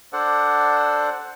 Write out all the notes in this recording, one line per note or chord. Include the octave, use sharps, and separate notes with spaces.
D4 A4 C5 D5 F#5